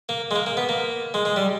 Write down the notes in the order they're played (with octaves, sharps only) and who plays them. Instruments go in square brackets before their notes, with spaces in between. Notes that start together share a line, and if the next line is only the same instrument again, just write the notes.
[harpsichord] A#3
G#3
A#3
A#3
B3
A#3
G#3
G#3
G3